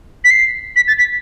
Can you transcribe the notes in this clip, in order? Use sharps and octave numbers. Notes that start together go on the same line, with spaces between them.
B6
C7
B6
A6
B6